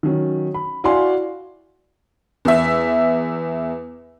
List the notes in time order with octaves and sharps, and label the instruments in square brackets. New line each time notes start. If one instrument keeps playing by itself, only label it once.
[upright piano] D#3 F#3 C#4
B5
E4 F#4 D5 F5 G#5 C6
[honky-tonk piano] E2 E5